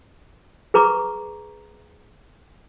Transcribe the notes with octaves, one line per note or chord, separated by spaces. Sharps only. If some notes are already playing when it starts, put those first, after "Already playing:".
G#4 B4 A#5 C#6 D6